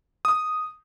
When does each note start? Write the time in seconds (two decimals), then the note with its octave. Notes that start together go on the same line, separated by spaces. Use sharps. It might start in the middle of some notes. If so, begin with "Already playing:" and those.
0.25 D#6